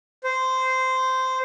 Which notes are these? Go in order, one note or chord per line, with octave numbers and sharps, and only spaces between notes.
C5